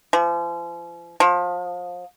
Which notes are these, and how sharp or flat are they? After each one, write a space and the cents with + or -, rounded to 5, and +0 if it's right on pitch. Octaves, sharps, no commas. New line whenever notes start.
F3 -40
F3 +25